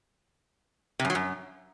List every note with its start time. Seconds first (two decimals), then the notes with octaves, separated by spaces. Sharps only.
0.99 C3
1.05 F#2
1.10 F#3
1.15 F#2